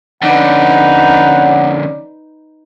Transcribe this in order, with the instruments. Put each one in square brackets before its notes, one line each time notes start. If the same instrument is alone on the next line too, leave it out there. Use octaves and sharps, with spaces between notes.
[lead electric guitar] F2 D3 [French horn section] C#4 D5 [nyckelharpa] D#4 B4 [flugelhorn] F#5